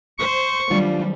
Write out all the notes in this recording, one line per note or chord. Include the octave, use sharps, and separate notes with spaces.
C5 C#6
D#3 F#3 G3 D4 F4 D5